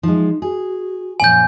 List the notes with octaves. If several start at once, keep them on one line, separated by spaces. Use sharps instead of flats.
F3 G#3 D#4
F#4 G#4
F#2 A#2 F3 G#5 G6